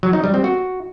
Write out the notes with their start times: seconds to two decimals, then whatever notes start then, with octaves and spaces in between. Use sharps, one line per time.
0.03 F#3
0.13 D#4
0.24 G3
0.34 C4
0.44 F#4